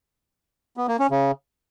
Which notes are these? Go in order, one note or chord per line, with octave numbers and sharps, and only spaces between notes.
B3
A#3
C#4
C#3